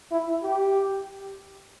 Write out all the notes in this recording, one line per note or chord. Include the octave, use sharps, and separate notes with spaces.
E4
G4